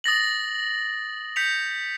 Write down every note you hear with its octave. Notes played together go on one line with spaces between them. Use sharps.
D#6 A6 A#6 F#7
G6 B6 C#7 F7